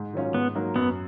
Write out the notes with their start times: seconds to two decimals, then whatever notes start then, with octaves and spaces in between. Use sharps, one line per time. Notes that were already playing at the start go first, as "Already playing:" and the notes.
Already playing: G#2
0.13 D#3 F#3 C#4 F4
0.34 G#2 B3
0.55 F#3 A#3 D#4
0.76 F#2 B3